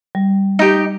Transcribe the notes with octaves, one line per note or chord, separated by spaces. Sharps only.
G3
D#4 G4